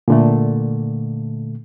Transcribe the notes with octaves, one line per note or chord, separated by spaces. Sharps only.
A#2 D3 A3